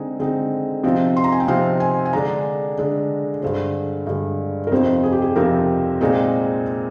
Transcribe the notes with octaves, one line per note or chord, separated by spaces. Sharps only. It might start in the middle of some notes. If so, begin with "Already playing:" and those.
Already playing: D3 G#3 C4 D#4 G#4
D3 G#3 C4 D#4
C3 F3 C4 D#4
C6
A#5
G#5
G5
C3 F3 C4 D#4 F5
G#5
G#5
D3 G#3 D4 A#5
D3 G#3 D4
G2 D3 G#3 C5
G2 D3 G#3
A#4
F2 C3 F3 C4 D#4 C5
G#4
G4
G#4
F2 C3 F3 C4 D#4 A#4
A#2 G#3 C4 D#4